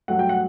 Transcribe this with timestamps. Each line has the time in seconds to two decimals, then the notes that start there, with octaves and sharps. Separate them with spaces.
0.08 G2 F#3 A3 F#5
0.19 G5
0.29 F#5